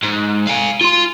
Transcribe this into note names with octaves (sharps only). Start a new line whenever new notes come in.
G#2
F5 G#5
F4 C6